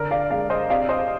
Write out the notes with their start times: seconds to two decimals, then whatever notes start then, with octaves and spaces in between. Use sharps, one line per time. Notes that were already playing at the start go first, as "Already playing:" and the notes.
Already playing: D3 A#4 D5
0.11 D5 F5
0.30 G#3 D5 F5
0.50 C5 D#5
0.70 C3 D5 F5
0.89 C5 D#5